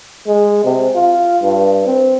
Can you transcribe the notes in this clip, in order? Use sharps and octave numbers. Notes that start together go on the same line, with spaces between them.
G#3
C3
F4
G2
C4